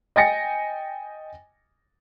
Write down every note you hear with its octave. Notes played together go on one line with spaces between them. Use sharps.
D#5 G5 G#5 A6 A#6 C#7